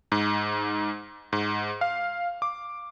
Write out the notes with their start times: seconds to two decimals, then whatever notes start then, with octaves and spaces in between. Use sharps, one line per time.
0.12 G#2
1.33 G#2
1.81 F5
2.42 D6